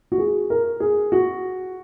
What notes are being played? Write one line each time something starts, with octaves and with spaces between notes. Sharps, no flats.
F#4
G#4
A#4
G#4
F#4